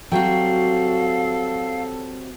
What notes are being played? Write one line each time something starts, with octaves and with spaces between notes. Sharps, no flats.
F#3 G3 C4 F#4 A4 F5 G5